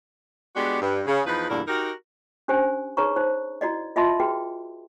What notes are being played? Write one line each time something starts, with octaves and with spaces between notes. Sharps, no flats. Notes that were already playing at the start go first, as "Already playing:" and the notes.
G#3 B3 D4 F#4 G4
G2
C#3
E2 F3 D#4 B4
E2 G2 A#2 D3 E4 A#4
D#4 F#4 G4 A#4
C#4 D4 G4 C5 G#5
D#4 G#4 B4 C#5 A#5 C#6
D#4 C5
E4 F#4 D5 D#5
F4 D#5 E5 A5 B5 C6
F#4 G#4 B4 G5